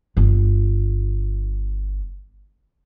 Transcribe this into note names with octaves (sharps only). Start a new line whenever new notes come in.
G1 F4